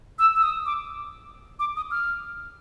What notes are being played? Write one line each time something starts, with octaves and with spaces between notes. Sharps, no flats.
E6
E6
D#6
D6
D6
D#6
F6